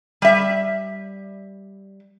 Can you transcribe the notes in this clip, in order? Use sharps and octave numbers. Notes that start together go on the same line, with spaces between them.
G3 E5